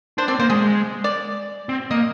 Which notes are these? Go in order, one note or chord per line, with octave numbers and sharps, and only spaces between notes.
D4 C5
C4 D5
A#3 C5
G#3 G#4
D5
C4
A#3 D#5